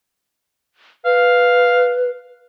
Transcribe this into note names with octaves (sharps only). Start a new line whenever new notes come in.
B4 F5